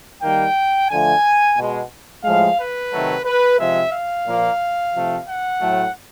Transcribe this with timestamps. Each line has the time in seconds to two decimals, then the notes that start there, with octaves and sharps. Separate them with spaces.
0.22 D#3 G3 A#3 G5
0.89 D3 F3 A3 G#5
1.57 B2 G#3
2.24 A2 F3 G#3 F5
2.58 B4
2.91 C3 D#3 F#3 A3
3.25 B4
3.59 C3 F3 G#3 E5
3.92 F5
4.26 A#2 F3 A#3
4.94 C3 F3 A3
5.27 F#5
5.61 A2 F#3 A3